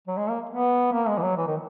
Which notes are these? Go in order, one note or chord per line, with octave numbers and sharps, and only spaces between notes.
F#3
G#3
A#3
B3
A#3
G#3
E3
F#3
E3
D#3